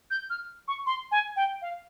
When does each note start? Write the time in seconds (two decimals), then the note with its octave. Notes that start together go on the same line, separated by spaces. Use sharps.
0.11 G6
0.30 F6
0.68 C#6
0.86 C6
1.11 G#5
1.36 G5
1.62 F5